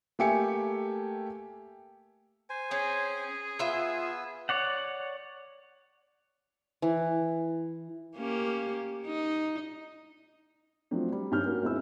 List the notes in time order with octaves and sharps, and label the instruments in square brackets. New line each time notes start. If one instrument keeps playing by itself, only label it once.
[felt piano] A3 A#3 G4 E5 G#5 C#7
[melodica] C5 G#5
[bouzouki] C4 C#4 [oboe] G#4
[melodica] B3 E6 [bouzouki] F4 E5
[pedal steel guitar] C#5 D5 F#5
[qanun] E3
[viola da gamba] A#3 C#4 G4
D#4
[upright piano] F3 F#3 A3 C4 D4
G3
G#1 G2 C#4 G4 F6 G6
A#3 C#4 F#4 A#4
G#1 D#2 G#3 D4 E4 E6